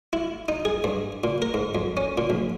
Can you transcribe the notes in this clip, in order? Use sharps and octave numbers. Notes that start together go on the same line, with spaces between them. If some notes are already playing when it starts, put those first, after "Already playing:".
E4
D#4
G#4
G2
A#2
A#4
G#2
F2
C#4
A#2
A#1